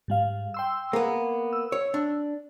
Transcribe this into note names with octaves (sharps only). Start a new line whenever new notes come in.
G#2 G3 F5
G5 C6 E6
A#3 B3 G#4
E6
C#5
D4